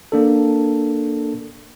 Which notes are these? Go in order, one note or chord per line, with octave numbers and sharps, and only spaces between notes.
A#3 D4 A4